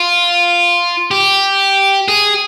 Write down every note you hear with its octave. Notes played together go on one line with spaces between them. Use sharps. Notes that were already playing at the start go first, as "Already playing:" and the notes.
Already playing: F4
G4
G#4